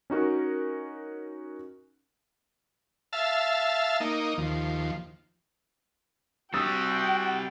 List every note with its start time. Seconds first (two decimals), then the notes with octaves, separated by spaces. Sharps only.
0.10 C#4 D#4 F#4 A#4
3.13 E5 F5 A5
4.00 A#3 D#4
4.38 D#2 F3
6.54 G3 C4 F#4 G4 G5 D#6 E6 A6